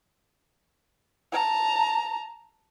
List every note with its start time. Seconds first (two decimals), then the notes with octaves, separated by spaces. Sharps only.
1.32 A5 A#5